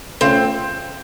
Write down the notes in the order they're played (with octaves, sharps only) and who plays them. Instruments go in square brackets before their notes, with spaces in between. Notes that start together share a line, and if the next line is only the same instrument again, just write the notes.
[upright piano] C#3 A3 C#4 F4 [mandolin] C4